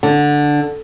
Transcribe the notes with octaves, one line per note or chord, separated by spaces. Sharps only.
D3